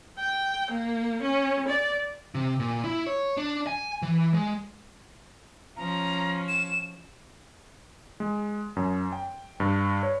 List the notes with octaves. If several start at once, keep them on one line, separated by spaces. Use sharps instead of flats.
G5
A#3
C#4
D5
C3
A#2
E4
C#5
D4
G#5
E3
G#3
F3 C#4 A#5
E7
G#3
F#2
G5
G2
C#5